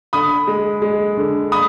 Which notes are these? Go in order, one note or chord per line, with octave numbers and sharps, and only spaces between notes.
D3 B5 D#6
G#3
G#3
D3
B5 D#6